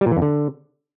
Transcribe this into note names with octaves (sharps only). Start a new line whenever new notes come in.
G3
A#2
E3
F2
D3